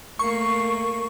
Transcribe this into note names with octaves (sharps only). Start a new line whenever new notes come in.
A3 A#3 C#6